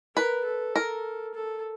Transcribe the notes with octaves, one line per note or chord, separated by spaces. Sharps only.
A#4 B4
A4
A#4
A4